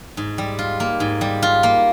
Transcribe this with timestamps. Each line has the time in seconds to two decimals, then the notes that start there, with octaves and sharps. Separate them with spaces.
0.17 G#2
0.38 G3
0.59 F4
0.80 A#3
1.00 G#2
1.21 G3
1.42 F4
1.63 A#3